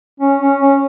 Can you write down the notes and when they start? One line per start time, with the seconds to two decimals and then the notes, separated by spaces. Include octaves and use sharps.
0.20 C#4
0.40 C#4
0.60 C#4